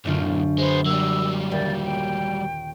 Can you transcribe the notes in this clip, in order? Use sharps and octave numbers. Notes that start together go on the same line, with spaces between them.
B1 F#2 A2 D3 F4
G#3 B3 C5
F#3 G3 A#3 E6
D#1 G4 D5
G5